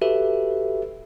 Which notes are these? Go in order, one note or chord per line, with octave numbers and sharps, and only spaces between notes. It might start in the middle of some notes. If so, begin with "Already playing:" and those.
F#4 G4 A4 B4 E5